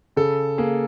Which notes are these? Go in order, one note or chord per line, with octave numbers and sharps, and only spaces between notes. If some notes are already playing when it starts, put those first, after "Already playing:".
C#3 A4
A#3 G#4